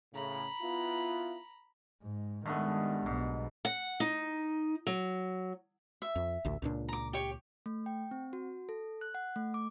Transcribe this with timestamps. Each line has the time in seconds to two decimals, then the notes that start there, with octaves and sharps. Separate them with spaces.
0.14 A2 C#3 A#5 B5
0.62 B3 E4 F4
2.03 G#2
2.46 G2 D#3 G#3 A3 B3
3.06 B1 G#2 B2
3.65 F#5
4.00 D#4
4.87 F#3
6.02 E5
6.16 F2
6.45 A1 D2
6.62 C#2 A#2 D4
6.89 A#5 D6
7.13 G4 C#5
7.66 A3
7.86 G5
8.11 C4
8.33 F#4
8.69 A4
9.01 F#6
9.15 F#5
9.36 A3
9.54 D6